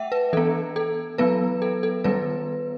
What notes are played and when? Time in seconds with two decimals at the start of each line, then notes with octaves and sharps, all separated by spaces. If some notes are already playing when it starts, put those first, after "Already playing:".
Already playing: A3 E5 F#5 G5
0.12 B4
0.33 E3 B3 A4
0.76 A4
1.18 F#3 B3 B4
1.62 A4
1.83 A4
2.04 D#3 G3 B3 B4